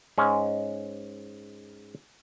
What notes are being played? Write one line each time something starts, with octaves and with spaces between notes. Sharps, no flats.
G#2 G#3 C#4